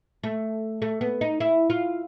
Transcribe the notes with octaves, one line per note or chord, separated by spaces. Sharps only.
A3
A3
B3
D#4
E4
F4